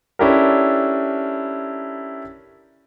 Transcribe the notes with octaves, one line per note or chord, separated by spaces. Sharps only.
C#4 D4 E4 G4 A4 A#4